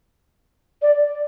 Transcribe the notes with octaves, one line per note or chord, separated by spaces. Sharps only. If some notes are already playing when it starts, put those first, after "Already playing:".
D5